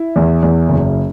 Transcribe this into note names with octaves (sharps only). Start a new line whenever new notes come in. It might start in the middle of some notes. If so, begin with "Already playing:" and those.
Already playing: E4
E2
E2
F#1